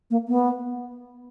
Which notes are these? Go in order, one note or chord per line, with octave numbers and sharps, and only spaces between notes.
A#3
B3